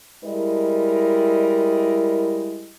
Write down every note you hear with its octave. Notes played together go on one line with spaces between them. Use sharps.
G3 G#3 E4 A#4 D#5